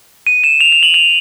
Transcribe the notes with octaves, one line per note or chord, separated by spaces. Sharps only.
D#7
E7
F7
F7
F#7
F7